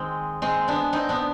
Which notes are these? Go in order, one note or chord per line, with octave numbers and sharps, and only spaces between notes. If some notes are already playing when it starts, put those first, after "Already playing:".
Already playing: D#3 G#3 C4
G#3 C4
B3 D4
C4 D#4
B3 D4